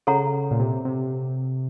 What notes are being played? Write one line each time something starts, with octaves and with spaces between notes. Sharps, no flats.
C#3 A4 C#5 F#5 A#5
A#2
C3
C3